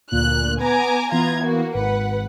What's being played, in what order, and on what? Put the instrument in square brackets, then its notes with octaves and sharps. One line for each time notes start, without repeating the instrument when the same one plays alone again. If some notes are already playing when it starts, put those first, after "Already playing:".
[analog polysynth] D2 A#2 [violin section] F#6
[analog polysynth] B3 [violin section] G#5 A#5 D6
[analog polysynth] E3 B3 [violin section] F4 A#5 G#6
[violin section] A#3 F#4
[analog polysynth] G#1 [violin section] B4 F#5